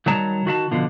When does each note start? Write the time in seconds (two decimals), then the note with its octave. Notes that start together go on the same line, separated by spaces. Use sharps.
0.06 D#3 F#3 G3 C#5 A5 A#5
0.46 D#3 F#4 E5 A5
0.71 B2 D3 F3